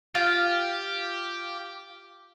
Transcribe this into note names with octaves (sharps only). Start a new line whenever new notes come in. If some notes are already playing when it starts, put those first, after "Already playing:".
F4 G4